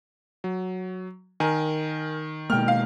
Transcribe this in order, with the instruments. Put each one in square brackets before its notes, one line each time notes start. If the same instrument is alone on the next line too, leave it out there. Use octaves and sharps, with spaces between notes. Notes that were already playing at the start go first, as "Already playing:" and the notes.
[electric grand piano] F#3
[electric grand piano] D#3 [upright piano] A#4 G#5
[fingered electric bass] B2 G#3 A#3 [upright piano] G5 F6
[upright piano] F5